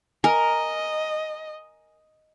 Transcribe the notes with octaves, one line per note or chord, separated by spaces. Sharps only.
A#4 D#5 G#5